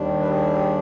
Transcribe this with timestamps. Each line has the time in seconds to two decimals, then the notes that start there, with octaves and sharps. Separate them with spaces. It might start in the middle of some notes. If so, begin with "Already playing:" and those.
Already playing: D#2 D#3 G3 D4
0.20 B4
0.29 G#4